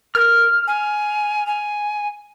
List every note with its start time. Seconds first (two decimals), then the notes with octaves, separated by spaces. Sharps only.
0.15 A#4 F6
0.67 G#5
1.47 G#5